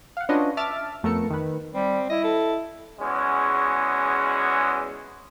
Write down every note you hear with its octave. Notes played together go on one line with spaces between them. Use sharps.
F5 F#5
C#4 D4 F4 F#4 B4 D#5
E5 A5 D6 F6 A6
F2 A3 B3 A4 A#4 C#7
D#3 B4
G3 C4
E4 D#5
A4
E2 G#3 C#4 F#4